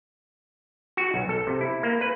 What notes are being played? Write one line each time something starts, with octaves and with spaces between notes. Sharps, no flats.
F#4
B1
A4
C3
E4
A#3
B4